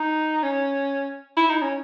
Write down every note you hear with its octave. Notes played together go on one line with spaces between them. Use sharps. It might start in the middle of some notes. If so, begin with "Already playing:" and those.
Already playing: D#4
C#4
E4
D#4
C#4